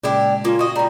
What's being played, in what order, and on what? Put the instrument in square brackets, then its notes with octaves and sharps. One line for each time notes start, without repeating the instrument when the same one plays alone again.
[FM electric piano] A#2 C#3 G#3 [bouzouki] D4 E4 G4
[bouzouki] A#3 C#4 [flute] F4
[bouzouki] F#4 D#5
[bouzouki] D#3 G3 [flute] A#5